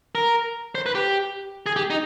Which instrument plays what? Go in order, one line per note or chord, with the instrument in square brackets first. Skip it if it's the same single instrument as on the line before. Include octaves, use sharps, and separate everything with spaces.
[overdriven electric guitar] A#4
C5
B4
G4
G#4
G4
D#4